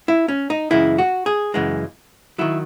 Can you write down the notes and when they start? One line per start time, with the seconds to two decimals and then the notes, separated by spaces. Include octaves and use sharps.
0.08 E4
0.28 C#4
0.50 D#4
0.71 F#2 C#3 E3 G#3 E4
0.98 F#4
1.26 G#4
1.54 F#2 C#3 E3 G#3
2.38 D#3 F#3 E4